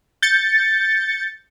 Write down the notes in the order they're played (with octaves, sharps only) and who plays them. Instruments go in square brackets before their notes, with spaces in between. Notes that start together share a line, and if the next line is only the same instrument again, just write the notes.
[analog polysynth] G6 A6 C#7